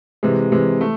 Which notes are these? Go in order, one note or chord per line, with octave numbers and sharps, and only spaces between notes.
C3 E3 G#3
C3 E3 G#3
A3